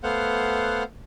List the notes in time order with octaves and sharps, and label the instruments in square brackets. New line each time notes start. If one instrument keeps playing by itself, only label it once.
[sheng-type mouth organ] A3 B3 C5 F5 F#5